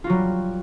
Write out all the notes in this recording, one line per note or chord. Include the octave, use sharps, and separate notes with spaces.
F#3 G3 F4 F#4